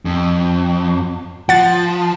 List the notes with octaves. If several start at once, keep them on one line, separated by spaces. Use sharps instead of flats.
F2
F3 F#5 A6